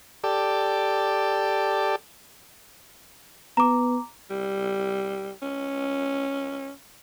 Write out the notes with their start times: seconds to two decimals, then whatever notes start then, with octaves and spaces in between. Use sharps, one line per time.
0.24 G4 A4 D5
3.57 B3 A#5 D6
4.30 G3
5.42 C#4